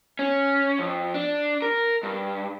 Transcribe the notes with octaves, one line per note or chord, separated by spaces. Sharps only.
C#4
F2
D4
A#4
G2